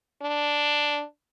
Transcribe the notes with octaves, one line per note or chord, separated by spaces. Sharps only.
D4